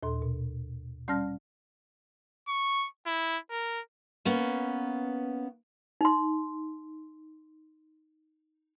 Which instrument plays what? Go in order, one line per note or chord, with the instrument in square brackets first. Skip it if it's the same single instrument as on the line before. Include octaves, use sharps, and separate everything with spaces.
[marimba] D#2 A#2 A4 C6
B2
G3 C#4 D5 A5 F6 A#6
[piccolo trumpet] C#6
E4
A#4
[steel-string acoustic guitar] A#3 B3 C#4
[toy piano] D#4 C6